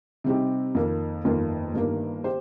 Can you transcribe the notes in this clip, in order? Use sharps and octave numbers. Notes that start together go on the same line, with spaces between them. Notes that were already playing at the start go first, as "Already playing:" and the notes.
C3 G3 C4 D#4 G4
F2 D#3 A#3
G1 F2 D#3 A#3 F4
G1 G2 D#3 A#3
G4 C5